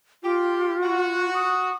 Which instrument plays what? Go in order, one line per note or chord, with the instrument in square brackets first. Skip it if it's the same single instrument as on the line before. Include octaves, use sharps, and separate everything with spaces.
[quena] F4 [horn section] G4
[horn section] F#4
[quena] D#6